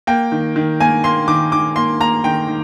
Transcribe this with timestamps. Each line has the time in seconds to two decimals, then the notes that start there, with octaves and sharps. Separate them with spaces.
0.07 A#3 G5
0.32 D#3
0.56 D#3
0.80 A#3 G#5
1.04 A#3 C6
1.28 D#3 D6
1.52 D#3 D6
1.76 A#3 C6
2.00 A#3 A#5
2.24 D#3 G5
2.48 D#3